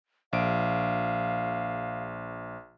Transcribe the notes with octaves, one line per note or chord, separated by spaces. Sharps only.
A#1 F5 D7